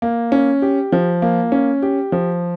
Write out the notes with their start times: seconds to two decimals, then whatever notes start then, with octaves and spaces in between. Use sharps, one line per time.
0.02 A#3
0.32 C#4
0.62 G4
0.92 F3
1.22 A#3
1.52 C#4
1.82 G4
2.12 F3